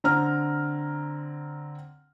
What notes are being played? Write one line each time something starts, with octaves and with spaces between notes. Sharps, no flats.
D3 C4 A#5 F6